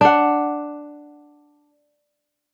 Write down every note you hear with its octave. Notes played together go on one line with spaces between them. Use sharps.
D4 F#5